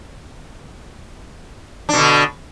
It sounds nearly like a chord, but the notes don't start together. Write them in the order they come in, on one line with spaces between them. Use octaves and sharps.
D4 B2 D3